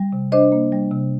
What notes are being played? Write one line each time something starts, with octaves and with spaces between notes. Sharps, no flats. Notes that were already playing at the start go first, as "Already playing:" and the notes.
Already playing: G3
C3
D4 C5 D#5
A#3
G3
C3